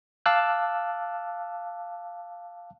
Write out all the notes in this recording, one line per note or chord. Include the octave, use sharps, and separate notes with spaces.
F5 A5 D6 E6 F#6